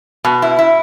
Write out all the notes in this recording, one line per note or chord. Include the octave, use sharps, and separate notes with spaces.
B2
E4
E4